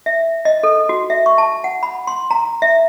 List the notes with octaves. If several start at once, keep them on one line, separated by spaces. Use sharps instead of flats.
E5
D#5
A4
F#4
E5
C#6
A5
F#5
B5
C6
A#5
E5